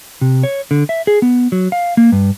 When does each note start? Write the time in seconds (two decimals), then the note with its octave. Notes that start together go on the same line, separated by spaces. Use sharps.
0.21 C3
0.43 C#5
0.71 D3
0.89 E5
1.07 G#4
1.22 B3
1.52 F#3
1.72 F5
1.97 A#3
2.12 G2